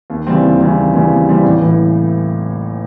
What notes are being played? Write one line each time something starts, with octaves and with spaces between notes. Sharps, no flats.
D#2
C#3 E3 G3 C4
D#2
C#3 E3 G3 C4
D#2
C#3 E3 G3 C4
D#2
C#3 E3 G3 C4
A1
A2 E3